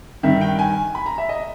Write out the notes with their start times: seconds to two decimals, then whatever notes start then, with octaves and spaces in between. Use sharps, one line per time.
0.23 G2 D#3 E5
0.41 G5
0.59 G#5
0.95 B5
1.06 A#5
1.18 E5
1.29 D#5